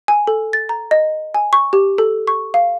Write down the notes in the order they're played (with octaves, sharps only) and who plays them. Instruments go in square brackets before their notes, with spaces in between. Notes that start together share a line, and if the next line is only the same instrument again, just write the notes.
[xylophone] G#5
A4
A6
A#5
D#5
G#5
C#6
G4
A4
C#6
F5